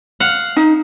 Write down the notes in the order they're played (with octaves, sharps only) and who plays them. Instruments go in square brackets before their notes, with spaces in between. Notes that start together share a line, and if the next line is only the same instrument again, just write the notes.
[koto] F5 F#5
[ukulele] D#4